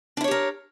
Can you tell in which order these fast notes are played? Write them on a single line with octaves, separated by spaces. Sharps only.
D4 E4 C#5 G4 A#4